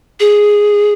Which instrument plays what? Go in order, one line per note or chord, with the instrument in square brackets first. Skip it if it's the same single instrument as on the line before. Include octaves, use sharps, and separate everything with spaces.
[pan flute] G#4